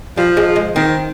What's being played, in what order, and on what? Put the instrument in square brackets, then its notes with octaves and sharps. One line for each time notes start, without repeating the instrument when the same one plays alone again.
[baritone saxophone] F3 [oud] G3
[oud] G#3
G#3
[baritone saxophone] D#3 [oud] C4